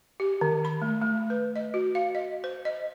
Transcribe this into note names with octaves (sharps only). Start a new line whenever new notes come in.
G4
D#3
B5
A3
A3
B4
D#5
F#4
F5
D#5
C5
D#5